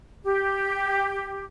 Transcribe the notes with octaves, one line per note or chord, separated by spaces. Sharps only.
G4